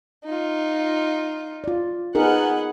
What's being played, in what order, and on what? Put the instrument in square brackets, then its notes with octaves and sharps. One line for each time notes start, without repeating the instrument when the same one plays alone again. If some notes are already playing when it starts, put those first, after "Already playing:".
[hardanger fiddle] D#4 F4
[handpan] F4 D5
[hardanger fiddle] B3 F#5 [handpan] D#4 G#4 A#4